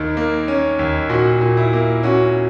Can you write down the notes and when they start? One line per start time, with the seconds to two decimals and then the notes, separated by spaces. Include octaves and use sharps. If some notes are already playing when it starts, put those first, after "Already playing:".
Already playing: D#2 D#3
0.17 A#3
0.48 C#4
0.79 D#2
1.09 A#2 F#4
1.41 A#2
1.57 E4
1.73 A#3
2.03 C#4 F#4